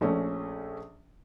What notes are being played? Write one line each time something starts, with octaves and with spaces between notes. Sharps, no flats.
A#1 A3 C#4